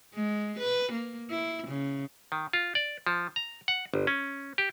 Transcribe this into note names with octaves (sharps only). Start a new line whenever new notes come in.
G#3
B4
A#3
E4
C#3
D#3
F4
D5
F3
A#5
F#5
G1
C#4
G4